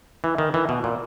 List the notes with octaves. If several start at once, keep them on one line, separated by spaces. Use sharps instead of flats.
E3
D#3
E3
B2
A#2